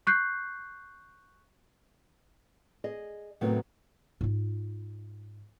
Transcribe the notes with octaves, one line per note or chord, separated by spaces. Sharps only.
C#6 F#6 G6 C7
G#4 D#5
A2 C3 D#3 F#3 A3 B3
G#2 F4